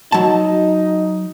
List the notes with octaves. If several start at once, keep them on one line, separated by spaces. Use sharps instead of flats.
F#3 D#4 A5